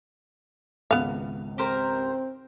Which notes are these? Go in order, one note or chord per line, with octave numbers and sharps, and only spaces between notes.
G#1 C#2 B3 F5
C4 G4 A#4 C5